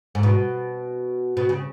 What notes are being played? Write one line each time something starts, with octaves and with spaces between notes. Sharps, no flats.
G#2
B2
B2
C#3